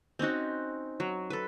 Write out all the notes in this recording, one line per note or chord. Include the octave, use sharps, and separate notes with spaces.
C4 C#4 D#4 F#4
F#3
A4 B4